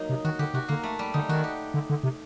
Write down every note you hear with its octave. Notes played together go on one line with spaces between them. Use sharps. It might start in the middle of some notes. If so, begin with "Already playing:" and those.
Already playing: F#3 A#3 D#4
C3
D#3 F#4
D3 G4
C3 F#4
D3 A#3
A3
G3
D3 D#4
D#3 F#4
G4
D3
D3
C3